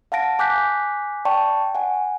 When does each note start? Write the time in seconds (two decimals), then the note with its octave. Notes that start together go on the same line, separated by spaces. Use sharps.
0.12 F5 F#5 A5 A#6 D7
0.39 G#5 D6 F#6 G6 B6
1.25 D5 G5 A5 C#6
1.75 F#5 G#5